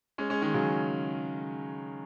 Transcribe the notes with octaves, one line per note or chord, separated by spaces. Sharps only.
G#3 C#4
G#3 C#4
D#3 G#3
C#3 F#3